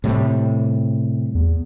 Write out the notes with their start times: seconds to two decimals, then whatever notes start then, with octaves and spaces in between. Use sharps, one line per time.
0.04 A2 C3 G3
1.35 E2